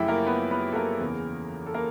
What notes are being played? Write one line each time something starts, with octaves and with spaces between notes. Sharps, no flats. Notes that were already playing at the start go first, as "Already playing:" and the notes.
Already playing: F#2 C#3 F3 A3 E4 G4 G5
A#3 A#4
B3 B4
B3 B4
A4
A#3 A#4
E2 C#3 E3
A4
A#3 A#4